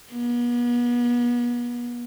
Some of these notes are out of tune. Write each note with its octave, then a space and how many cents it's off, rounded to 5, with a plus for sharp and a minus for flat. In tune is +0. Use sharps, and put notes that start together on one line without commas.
B3 -40